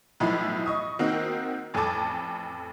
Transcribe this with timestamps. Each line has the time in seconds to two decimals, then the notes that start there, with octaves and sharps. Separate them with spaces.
0.20 B1 A2 E3 F3 D#5 B5
0.66 D#5 C#6 D#6
0.99 D#3 A#3 C4 D#4 F#4
1.74 A1 F2 A4 G#5 A5 D6